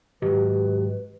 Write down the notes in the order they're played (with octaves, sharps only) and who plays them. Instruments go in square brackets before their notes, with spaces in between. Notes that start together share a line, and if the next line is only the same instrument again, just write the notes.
[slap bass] G#2 D#3 F#3 [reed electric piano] F#4 G4 D#5 [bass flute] B4